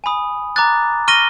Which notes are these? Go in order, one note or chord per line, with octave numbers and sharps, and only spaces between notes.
G#5 B5 D#6
A#5 D6 F#6 A6
C#6 F6 A#6 D#7 G7